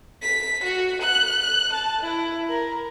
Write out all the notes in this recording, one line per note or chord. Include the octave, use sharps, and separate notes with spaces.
B6
F#4
F#6
A5
E4
A#4